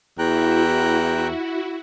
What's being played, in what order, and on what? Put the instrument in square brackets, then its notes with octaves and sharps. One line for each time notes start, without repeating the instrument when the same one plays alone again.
[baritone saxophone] E2 [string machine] E4 F#4 [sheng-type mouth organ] G5 A#5 F#6